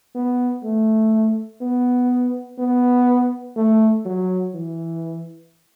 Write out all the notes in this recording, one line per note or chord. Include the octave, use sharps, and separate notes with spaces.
B3
A3
B3
B3
A3
F#3
E3